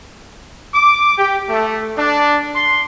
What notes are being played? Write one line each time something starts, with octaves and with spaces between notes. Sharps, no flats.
D6
G4
A3
D4
C6